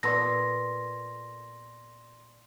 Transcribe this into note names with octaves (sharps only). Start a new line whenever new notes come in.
A#2 B3 A4 D5 C6 A#6